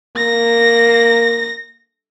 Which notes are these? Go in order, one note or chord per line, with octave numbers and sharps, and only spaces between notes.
A#3 A#6